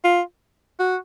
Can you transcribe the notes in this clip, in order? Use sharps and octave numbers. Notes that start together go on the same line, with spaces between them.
F4
F#4